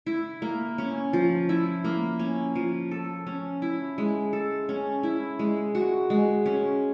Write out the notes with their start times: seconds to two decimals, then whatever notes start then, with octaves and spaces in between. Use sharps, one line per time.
0.07 E4
0.42 A#3
0.78 C#4
1.13 F3
1.49 E4
1.84 A#3
2.19 C#4
2.55 F3
2.91 A4
3.27 C#4
3.62 E4
3.98 G#3
4.33 A4
4.69 C#4
5.03 E4
5.39 G#3
5.75 F#4
6.10 G#3
6.46 C#4